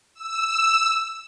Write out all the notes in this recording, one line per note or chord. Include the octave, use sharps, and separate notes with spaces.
E6